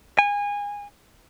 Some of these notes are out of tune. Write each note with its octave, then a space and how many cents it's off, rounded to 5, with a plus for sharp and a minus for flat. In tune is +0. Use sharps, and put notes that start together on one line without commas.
G#5 -25